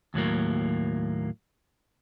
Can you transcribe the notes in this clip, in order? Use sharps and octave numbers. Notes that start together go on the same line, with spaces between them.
D#2 A2 F#3 A#3